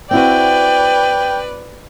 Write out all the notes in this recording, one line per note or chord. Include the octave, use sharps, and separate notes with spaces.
C4 E4 F#4 B4 D5 G5